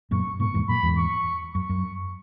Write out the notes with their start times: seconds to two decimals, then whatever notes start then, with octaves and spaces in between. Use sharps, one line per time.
0.11 F#2 A#2 C#6
0.40 G#2 B2 C#6
0.54 E2 G#2
0.69 F#2 A#2 B5
0.83 E2 G#2
0.97 C#6
1.54 F#2 C#6
1.69 F#2